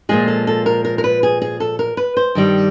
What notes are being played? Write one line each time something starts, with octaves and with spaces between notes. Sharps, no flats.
A#2 F3 G#3 G#4
A4
A4
A#4
A#4
A#4
B4
G#4
G#4
A4
A#4
B4
C5
G2 D#3 G3